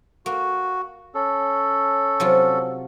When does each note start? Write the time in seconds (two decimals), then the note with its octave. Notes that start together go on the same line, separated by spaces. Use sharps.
0.26 A#3 F#4
1.15 C#4 A4
2.20 C3 F#3 F4